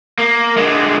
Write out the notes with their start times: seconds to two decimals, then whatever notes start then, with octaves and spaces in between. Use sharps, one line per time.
0.19 A#3
0.57 D3 G#3